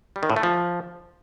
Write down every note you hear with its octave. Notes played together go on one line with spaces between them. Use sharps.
G3
D#3
A2
A3
F3